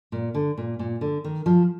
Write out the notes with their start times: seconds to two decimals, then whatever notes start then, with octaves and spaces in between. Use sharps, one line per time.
0.12 A#2
0.35 D3
0.58 A#2
0.79 A#2
1.01 D3
1.24 D#3
1.46 F3